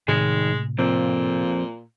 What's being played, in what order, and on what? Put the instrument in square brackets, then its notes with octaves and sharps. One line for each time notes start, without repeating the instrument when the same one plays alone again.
[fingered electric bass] A2 C3 [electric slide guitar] D#3 G#4 [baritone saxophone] G#3
[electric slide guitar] F2 C4 [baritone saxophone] A#2